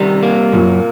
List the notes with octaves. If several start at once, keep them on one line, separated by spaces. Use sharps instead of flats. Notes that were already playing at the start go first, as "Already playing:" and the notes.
Already playing: C3 D#3 G3
A#3
F#2 A#2